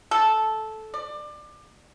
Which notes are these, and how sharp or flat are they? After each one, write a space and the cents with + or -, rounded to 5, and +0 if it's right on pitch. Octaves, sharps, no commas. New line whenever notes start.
A4 -10
D5 +25